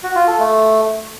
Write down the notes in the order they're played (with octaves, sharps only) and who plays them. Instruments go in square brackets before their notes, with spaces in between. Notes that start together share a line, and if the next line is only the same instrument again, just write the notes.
[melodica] F#4
F4
A4
A3